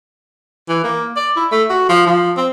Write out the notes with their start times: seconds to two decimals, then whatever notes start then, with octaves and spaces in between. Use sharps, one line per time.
0.69 E3
0.84 A#3
1.16 D5
1.36 E4
1.52 A3
1.70 F#4
1.89 F3
2.06 F3
2.37 C4